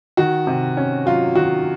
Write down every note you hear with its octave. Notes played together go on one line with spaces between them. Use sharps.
D#3 F#4
C3
C#4
F#3 F4
D#3 F#4